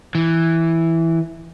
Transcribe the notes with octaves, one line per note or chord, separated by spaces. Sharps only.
E3